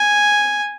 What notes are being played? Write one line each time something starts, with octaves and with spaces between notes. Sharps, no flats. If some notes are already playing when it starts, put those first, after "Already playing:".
Already playing: G#5